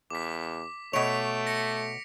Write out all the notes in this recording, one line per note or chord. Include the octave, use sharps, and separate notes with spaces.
E2 D6 B6
B2 A3 C#5 B6 D7 F7
A#6 C#7